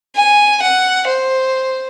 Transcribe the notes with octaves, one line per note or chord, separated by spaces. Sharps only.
G#5
F#5
C5